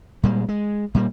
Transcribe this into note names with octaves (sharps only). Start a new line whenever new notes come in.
A#2 G3 G#3
G#3
A#2 G3 A#3